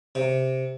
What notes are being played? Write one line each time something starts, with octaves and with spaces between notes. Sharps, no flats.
C3